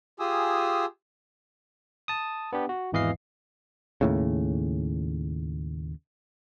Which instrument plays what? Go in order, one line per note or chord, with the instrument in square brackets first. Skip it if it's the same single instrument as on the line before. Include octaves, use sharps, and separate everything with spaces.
[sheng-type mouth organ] F4 G4 G#4 G#5 D#6 E6
[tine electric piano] A5 D#6
B3 D4 G4
F#4
G#1 E2 E3 D#5 F5 C7
[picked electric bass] D#2 A2 C#3